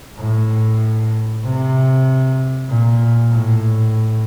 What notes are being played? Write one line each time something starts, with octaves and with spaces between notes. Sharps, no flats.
A2
C3
A#2
A2